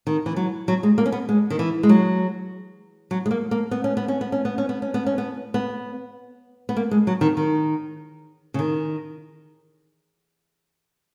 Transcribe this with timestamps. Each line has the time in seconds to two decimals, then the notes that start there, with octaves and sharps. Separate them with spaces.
0.07 D#3
0.26 E3
0.36 F#3
0.68 F#3
0.83 G#3
0.98 A#3
1.06 C#4
1.12 B3
1.29 G#3
1.50 D#3
1.59 E3
1.83 G#3
1.89 F#3
3.11 F#3
3.26 G#3
3.31 A#3
3.51 A#3
3.71 B3
3.84 C#4
3.97 B3
4.08 C#4
4.21 B3
4.32 C#4
4.45 B3
4.58 C#4
4.69 B3
4.82 C#4
4.94 B3
5.06 C#4
5.18 B3
5.54 B3
6.69 B3
6.76 A#3
6.91 G#3
7.07 F#3
7.21 D#3
7.37 D#3
8.54 C#3
8.59 D#3